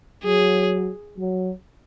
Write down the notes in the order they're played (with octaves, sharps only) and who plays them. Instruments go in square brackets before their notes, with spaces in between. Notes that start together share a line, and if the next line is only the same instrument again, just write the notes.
[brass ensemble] F#3 [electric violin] G#4
[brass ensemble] F#3